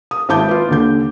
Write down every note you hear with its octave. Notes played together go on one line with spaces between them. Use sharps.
D#6
G#1 E4 A5 D6 G6
F4 B4
D#2 D3 G6